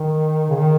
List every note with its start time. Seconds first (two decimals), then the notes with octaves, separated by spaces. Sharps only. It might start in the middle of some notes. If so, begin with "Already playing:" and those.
Already playing: D#3
0.50 C#3
0.56 D#3